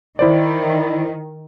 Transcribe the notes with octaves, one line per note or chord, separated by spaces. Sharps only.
D#3 E4 C5 D5